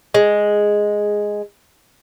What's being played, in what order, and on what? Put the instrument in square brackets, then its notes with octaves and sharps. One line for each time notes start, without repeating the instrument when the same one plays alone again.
[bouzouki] G#3